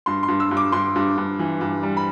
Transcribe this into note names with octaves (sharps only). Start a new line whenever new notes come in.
G2 C6
C6
G2
E6
G2
D6
G2 C6
G2
G2
E3
G2
G3
B5